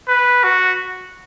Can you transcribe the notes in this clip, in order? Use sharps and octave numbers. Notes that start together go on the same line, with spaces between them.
B4
F#4